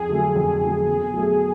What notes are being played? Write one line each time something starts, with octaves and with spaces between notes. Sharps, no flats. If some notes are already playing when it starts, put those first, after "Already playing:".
Already playing: F2 G#4
D3 F#3 A3
F2
D3 F#3 A3
B2
F#3 A3